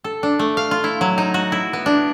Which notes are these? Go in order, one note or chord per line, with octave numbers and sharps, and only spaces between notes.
A4
D4
A3
F5
F4
E4
F#3
D#4
F#4
E4
B3
D4